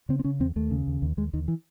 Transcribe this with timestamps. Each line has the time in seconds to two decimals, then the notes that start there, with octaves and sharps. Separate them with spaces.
0.09 C#3 C4
0.19 C4
0.24 C#3 C#4
0.40 E2 C4
0.56 D#2 A3
0.71 C#3
0.87 D#2
1.02 D#2
1.17 D#2 G#3
1.33 D#2 D#3
1.48 E3